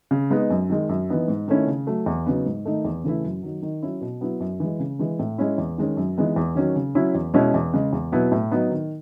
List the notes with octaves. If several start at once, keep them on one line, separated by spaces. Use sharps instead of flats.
C#3
G#3 B3 D#4
F#2
D#3 G#3
F#2
E3 B3 D#4
G#2
D#3 A3 C#4 E4
C#3
F#3 A3
E2
C#3 F#3 B3 D#4
G#2
D#3 A3 D#4
E2
C#3 E3 A3 E4
F#2
D#3 F#3
D#3
F#3 C#4 E4
B2
F#3 B3 E4
F#2
E3 G#3
C#3
E3 G#3
A2
G#3 C#4 E4
E2
D#3 G#3 C#4
F#2
E3 G#3 B3 D#4
E2
D#3 F#3 C#4
C#3
F#3 C#4 E4
E2
B2 G#3 C#4 E4
E2
C#3 G#3
E2
B2 F#3 B3 E4
A2
F#3 B3 D#4
D#3